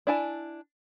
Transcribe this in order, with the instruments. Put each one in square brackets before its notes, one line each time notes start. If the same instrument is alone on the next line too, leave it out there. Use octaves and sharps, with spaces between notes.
[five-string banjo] D4 E4 G#5 A5